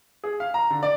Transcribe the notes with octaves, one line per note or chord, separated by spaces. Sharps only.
G#4
F5
A#5
D3
D5